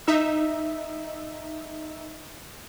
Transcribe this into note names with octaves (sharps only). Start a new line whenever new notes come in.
D#4 E5